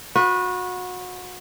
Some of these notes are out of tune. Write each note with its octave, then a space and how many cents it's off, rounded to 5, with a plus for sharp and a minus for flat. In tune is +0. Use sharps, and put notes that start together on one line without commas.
F#4 -30 B4 -5